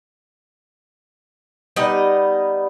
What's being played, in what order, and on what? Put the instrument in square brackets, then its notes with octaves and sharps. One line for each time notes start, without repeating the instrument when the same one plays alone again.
[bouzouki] G3 B3 D#4 D#5